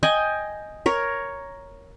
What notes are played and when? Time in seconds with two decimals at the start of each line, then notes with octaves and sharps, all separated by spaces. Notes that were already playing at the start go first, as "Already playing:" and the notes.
0.03 D#5 G5 G#5
0.86 A#4 C#5